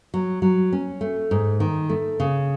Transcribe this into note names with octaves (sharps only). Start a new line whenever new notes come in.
F#3
F#3
C#4
A3
G#2
D#3
A3
C#3